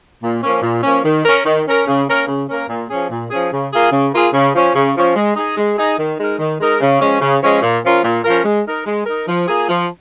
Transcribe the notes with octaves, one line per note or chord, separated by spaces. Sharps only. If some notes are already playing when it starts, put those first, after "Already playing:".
A#2
F3 A#3 C#4
A#2
F3 A#3 C#4
D#3
C#4 A#4
D#3
C#4 A#4
C#3
A#3 C#4 A#4
C#3
A#3 C#4 A#4
A#2
F3 C#4 G#4
A#2
F3 C#4 G#4
C#3
A#3 F4 G#4
C#3
A#3 F4 G#4
C#3
F3 C#4
C#3
F3 C#4
G#3
D#4 G#4
G#3
D#4 G#4
D#3
G#3 D#4 A#4
D#3
G#3 D#4 A#4
C#3
F3 G#3 C#4
C#3
F3 G#3 C#4
A#2
F3 C#4 F4 A#4
A#2
F3 C#4 F4 A#4
G#3
D#4 A#4
G#3
D#4 A#4
F3
A#3 F4 G#4
F3